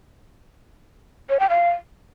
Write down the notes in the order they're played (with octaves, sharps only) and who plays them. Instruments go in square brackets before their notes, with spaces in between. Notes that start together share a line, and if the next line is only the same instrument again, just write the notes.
[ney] C#5
G5
F5